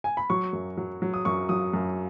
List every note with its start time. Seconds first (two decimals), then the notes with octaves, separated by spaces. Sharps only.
0.04 G#5
0.17 B5
0.30 F#3 C#6
0.53 F#2
0.77 F#3
1.02 F#3
1.14 D#6
1.25 F#2 C#6
1.49 F#3 D#6
1.73 F#2